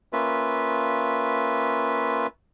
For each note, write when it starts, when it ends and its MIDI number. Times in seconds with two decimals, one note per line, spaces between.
0.13 2.27 58
0.13 2.27 61
0.13 2.27 65
0.13 2.27 71
0.13 2.27 76